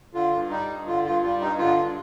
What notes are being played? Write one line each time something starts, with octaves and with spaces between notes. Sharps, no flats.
D3 F4
G2
G3 D#4
G2
D3 F4
G2 F4
G3 F4
G2 D#4
D3 F4
G2